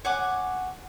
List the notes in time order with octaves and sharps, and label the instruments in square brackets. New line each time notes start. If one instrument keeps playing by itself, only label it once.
[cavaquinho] C#5 F#5 G#5 D6